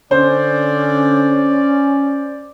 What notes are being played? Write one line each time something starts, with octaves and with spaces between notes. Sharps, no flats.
D3 C#4 C5 D5